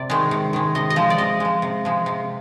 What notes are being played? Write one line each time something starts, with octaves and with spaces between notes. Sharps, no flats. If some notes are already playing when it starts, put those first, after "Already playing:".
Already playing: C3 D5
D#3 G#3
C3
D#3 G#3
C3 D#5
D#5
F3 G#3
D5
C3 D#5
F3 G#3
C3
F3 G#3
C3